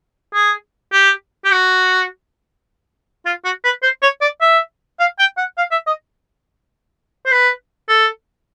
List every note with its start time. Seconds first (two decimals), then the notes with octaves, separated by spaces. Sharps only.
0.34 G#4
0.93 G4
1.45 G4
1.52 F#4
3.26 F4
3.45 F#4
3.64 B4
3.83 C5
4.02 C#5
4.21 D5
4.41 E5
5.00 F5
5.19 G5
5.37 F#5
5.58 F5
5.71 E5
5.87 D#5
7.26 C5
7.32 B4
7.89 A4